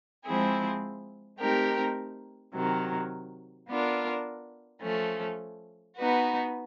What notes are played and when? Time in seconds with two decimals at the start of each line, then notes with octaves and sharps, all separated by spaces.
0.25 F3 G#3 C4 E4 G#4
1.40 A3 C4 D#4 G4 A#4
2.54 C3 D#3 F#3
3.68 B3 D4 F4 A#4
4.82 F3 A3 C#4
5.97 B3 D#4 F#4 B4